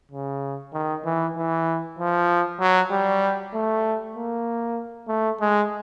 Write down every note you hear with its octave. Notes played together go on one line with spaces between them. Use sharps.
C#3
D#3
E3
E3
F3
F#3
G3
A3
A#3
A3
G#3